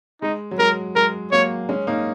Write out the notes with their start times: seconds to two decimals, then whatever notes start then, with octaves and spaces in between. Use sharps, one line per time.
0.22 G#3 D#4
0.51 F#3
0.59 G#3 A#4
0.96 G#3 A#4
1.32 F#3 A#3 C#5
1.69 G#3 C#4
1.87 A#3 D#4